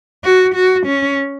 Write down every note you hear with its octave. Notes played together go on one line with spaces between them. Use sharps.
F#4
F#4
C#4